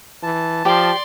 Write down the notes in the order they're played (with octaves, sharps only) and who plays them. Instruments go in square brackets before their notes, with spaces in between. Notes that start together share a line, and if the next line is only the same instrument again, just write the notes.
[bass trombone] E3 [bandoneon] A5
[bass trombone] F3 [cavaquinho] G4 [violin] D5 C6